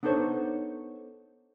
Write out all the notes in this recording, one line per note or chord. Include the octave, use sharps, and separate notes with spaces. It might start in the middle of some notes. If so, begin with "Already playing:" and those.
B3 D4 D#4 A4 C5 C#5